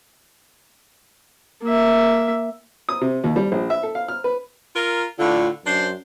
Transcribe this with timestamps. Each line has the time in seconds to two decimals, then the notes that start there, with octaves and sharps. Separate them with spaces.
1.64 A#3 E5
2.89 D#6
3.01 C3
3.24 D#2
3.36 G3
3.52 A#1
3.70 E5
3.83 A4
3.95 F5
4.08 F6
4.24 B4
4.75 F4 A#4
5.19 A2 D3 F4
5.66 F#2 D4 C5